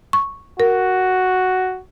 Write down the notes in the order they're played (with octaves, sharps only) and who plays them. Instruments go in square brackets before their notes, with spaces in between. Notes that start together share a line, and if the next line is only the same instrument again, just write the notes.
[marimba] C#6
[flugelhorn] F#4 [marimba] A#4